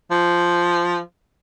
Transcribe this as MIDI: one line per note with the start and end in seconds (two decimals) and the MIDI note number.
0.11 1.00 53